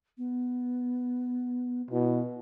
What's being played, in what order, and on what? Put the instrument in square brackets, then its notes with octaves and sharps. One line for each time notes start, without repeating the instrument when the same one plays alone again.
[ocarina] B3
[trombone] B2 [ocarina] E4